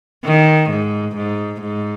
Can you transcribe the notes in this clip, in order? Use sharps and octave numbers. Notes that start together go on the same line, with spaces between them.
D#3
G#2
G#2
G#2